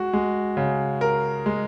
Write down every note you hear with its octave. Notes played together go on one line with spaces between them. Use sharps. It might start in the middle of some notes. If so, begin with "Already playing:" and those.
Already playing: G#3 F#4
G#3
C#3
A#4
G#3